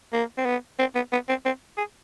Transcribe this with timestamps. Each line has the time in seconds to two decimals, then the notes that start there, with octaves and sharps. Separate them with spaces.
0.13 A#3
0.38 C4
0.45 B3
0.79 C4
0.95 B3
1.12 B3
1.29 C4
1.45 C4
1.77 G#4